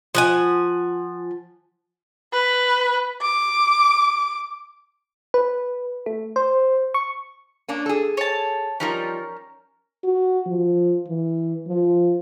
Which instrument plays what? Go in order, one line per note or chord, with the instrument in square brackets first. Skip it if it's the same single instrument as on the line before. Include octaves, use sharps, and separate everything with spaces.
[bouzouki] F3 F#5 G#5
[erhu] B4
D6
[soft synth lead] B4
A3
C5
C#6
[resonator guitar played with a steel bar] A#3 C#4 D4
G#4 A4
[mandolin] C#5 A5
[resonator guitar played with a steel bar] F3 G3 D#4 [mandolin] C#4 A#4
[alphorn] F#4
F3
E3
F3